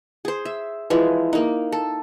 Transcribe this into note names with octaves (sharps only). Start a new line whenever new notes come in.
G#4 C5
E5
E3 F3 G#3
A#3 D#4
A4